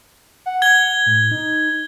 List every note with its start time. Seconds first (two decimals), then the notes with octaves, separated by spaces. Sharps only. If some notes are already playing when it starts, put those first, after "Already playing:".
0.46 F#5
0.62 G#6 G7
1.06 A2
1.31 D#4